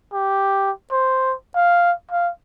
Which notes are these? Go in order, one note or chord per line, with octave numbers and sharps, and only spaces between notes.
G4
C5
F5
F5